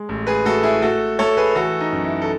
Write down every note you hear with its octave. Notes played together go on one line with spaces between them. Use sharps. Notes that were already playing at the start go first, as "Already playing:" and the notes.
Already playing: G#3
A1
G#4 B4
A3 F#4 A4
E4 G#4
A3 F#4 A4
A3 A4 C#5
G#4 B4
E3 F#4 A4
D#4
F#2
E4
A4